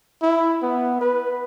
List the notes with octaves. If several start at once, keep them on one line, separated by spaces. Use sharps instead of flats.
E4
B3
B4